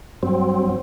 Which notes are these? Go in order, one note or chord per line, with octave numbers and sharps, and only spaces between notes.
G2 F#3 C4